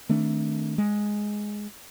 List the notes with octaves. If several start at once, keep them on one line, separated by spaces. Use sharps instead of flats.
D#3 A3 C4 D4
G#3